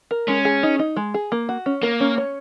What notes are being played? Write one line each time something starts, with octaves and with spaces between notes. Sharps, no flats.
A#4
G#3 C#4
G#4
D#4
D#4
G#3
G#4
A#3
F#4
C#4
A#3 A#4
C#4
C#5